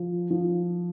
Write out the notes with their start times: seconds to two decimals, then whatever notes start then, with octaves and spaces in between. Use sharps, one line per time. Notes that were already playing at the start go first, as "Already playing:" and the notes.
Already playing: F3
0.30 F3